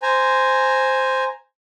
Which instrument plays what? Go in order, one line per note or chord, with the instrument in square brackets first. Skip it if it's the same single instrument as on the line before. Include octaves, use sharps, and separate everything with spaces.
[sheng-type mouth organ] C5 G#5 A#5